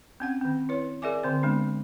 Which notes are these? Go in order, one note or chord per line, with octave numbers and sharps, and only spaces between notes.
C4 C#4 F#5
D#3 C4
E4 B4 C#5
G#4 A#4 D5 E5 G#5 D6
D3 C4 C5
G#3 B3 D4